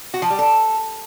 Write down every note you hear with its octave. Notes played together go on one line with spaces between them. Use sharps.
F#4
F3
G3
A4